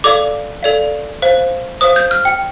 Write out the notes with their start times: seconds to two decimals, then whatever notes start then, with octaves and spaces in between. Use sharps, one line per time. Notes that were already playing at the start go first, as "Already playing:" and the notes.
0.04 A4 D5 F5 D6
0.63 A4 D5 F5
1.22 C5 F5
1.81 C5 F5 D#6
1.96 G6
2.11 F6
2.25 G5